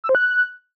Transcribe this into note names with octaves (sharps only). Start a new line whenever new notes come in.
E6
C5
F#6